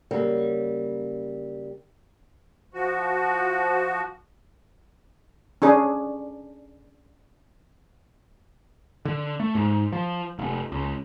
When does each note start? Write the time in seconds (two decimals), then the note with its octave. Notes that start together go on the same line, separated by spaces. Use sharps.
0.11 C#3 F#3 G3 A#3
2.74 F3 F#4
5.62 C#4 D4 G#4
9.05 D3
9.40 A3
9.55 G#2
9.93 F3
10.39 F1
10.72 C#2